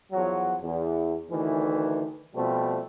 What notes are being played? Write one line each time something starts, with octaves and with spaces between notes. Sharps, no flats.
E2 F3 F#3
E2
D2 D#3 E3
B2 F3 G3 A3 C4